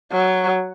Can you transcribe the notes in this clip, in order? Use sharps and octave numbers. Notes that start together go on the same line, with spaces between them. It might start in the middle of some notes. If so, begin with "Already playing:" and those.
F#3